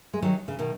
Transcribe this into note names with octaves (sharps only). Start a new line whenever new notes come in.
G#3
D#3 F#3
C#3
B2 D#3